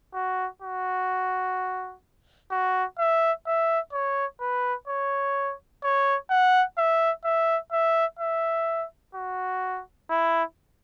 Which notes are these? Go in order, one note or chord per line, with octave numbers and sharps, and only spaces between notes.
F#4
F#4
F#4
E5
E5
C#5
B4
C#5
C#5
F#5
E5
E5
E5
E5
F#4
E4